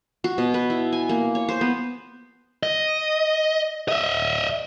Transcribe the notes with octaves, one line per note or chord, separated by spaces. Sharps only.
F#4
B2
B4
E4
G#5
A#3
C#5
C5
B3
D#5
D#5 E5